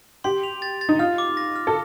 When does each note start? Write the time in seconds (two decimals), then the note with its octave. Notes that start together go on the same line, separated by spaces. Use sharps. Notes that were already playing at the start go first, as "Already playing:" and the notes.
0.24 G4 C6
0.43 F7
0.62 A6
0.81 A6
0.89 D#4
0.99 F4 F6
1.18 D6
1.37 A#6
1.56 F6
1.67 A4